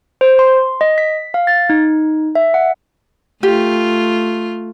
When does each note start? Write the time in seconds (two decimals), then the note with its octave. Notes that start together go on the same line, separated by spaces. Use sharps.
0.21 C5
0.39 C6
0.81 D#5
0.98 B6
1.34 F5
1.47 A6
1.70 D#4
2.35 E5
2.54 F#5
3.43 A3 F4 G4